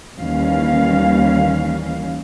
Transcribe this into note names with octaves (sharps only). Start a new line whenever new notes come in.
D#2 E3 G3 C#4 F5